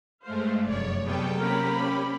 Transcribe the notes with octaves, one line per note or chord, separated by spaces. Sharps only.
G2 G#3 A3 C5 F5
F1 F#2 C#5 D5
C3 F#3 G3 B3 G#4 A4 G5
A#3 C4 C#4 G4 A#4 B5
G3